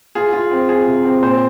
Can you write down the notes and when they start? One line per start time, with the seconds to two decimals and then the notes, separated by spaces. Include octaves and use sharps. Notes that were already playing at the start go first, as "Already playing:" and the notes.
0.15 F4 G#4
0.33 F4
0.51 C4
0.68 F4 G#4
0.87 C3
1.05 C4
1.22 A#2 C5